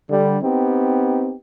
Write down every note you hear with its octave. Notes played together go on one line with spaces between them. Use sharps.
D3 G3
B3 C4 D#4 G4